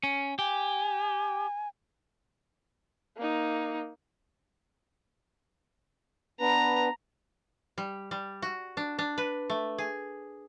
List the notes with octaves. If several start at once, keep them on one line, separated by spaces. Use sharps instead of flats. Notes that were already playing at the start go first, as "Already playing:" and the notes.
C#4
G4 G#5
A#3 D#4
B3 D4 B4 A#5
G3
G3
F#4
D4
D4
B4
A3
G#4